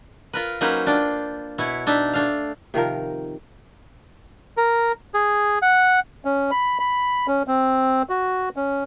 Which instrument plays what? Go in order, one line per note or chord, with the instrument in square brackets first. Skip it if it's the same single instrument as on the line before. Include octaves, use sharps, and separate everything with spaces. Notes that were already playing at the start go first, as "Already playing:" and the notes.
[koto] F4 A#4 B4
F#3 A#3 C#4 D#4 B4 C5
D4 F4 G5
B2 E4 C#5
D4 D#4 E5
A3 D4 F5
[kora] C3 D#3 F3 A#4
[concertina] A#4
G#4
F#5
[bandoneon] C#4
B5
B5
C#4
C4
F#4
C#4